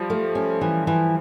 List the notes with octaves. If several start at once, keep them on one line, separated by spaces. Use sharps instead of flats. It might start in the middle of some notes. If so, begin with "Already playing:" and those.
Already playing: F3 G3
A3
C#4
E3
E3